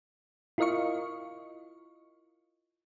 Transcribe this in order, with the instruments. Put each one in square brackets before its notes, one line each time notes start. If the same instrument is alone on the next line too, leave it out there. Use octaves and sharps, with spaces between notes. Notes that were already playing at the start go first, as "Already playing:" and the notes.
[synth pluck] E4 F4 A#4 D#5 F5 C#6